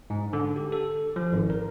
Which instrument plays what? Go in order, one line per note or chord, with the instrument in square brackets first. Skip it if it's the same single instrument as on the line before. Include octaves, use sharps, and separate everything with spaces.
[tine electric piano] G#2
D3
G4
A4
F3
G#1
A#4